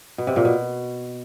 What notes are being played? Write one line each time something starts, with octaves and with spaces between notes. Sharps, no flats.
B2
C3
A#2
B2